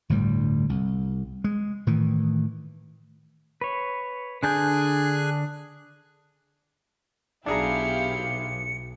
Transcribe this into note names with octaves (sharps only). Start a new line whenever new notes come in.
G1 D2 A2 G3
C2
G#3
A2 D#3 E3
B4 C#5
D3 D4 G#4 G#5 F#6 G6
B1 D4 E4 G4 G#4 F5 A#5 C#7